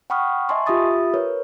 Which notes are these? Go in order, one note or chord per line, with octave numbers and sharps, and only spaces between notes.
F#5 G5 B5 C#6 D#6 F6
D#5 E5 G#5 A5 C6 C#6
F4 G4 E5 B5 D#6 A6
A#4 B4 C#5